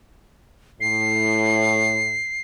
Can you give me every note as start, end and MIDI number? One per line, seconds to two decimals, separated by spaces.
0.81 2.20 45
0.81 2.42 96